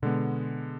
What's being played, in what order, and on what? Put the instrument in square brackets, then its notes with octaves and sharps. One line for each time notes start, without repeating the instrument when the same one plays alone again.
[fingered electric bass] B2 [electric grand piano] D3 G#3 B3